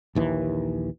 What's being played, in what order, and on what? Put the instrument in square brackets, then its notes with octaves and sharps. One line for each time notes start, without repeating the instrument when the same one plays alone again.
[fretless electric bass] A#1 D#2 E3